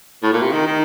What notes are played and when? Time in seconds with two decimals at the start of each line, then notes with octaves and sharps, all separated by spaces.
0.23 A2
0.33 A#2
0.42 C3
0.52 D#3
0.67 D#3